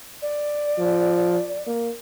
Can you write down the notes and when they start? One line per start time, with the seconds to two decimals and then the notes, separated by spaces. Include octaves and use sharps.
0.22 D5
0.78 F3
1.67 A#3